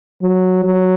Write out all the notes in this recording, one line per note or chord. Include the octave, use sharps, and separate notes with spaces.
F#3
F#3